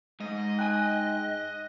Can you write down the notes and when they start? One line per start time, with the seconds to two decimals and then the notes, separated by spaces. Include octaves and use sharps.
0.20 G#2 D#5
0.59 G5 G#5 F#6